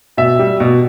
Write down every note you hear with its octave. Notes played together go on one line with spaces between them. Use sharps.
B2 E5
G3
B2